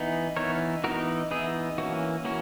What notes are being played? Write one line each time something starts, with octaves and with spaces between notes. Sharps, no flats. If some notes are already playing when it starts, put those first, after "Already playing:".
Already playing: E3 B3 D#4
E3 B3 D#4 A#4 C#5
E3 B3 D#4 F#4 A#4
E3 B3 D#4 E4 G#4
E3 A#3 C#4 F#4
E3 A#3 C#4 F#4